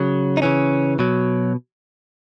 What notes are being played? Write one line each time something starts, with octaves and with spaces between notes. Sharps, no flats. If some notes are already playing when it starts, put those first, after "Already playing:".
Already playing: C#3 F#3
D#4
C#3 E3 C#4
B2 F#3